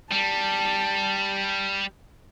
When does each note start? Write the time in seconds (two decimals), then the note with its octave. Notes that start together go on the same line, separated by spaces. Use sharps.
0.12 G3 A5